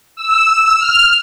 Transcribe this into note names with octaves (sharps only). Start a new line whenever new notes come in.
E6
F6